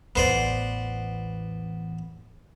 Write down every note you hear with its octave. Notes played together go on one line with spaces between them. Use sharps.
A1 E2 B3 C5 D5